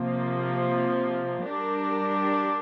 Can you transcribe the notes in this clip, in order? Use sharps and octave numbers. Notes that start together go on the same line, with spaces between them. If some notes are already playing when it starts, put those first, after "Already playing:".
Already playing: C3 F3 A#3
G3 D4 G4 A#4